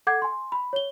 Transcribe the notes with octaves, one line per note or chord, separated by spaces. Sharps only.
A4 F#5 D6 G6 G#6
G#5 C6
B5
C#5 G7